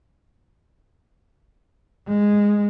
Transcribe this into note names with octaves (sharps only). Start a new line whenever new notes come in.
G#3